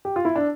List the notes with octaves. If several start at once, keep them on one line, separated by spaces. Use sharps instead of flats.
G4
F4
E4
D4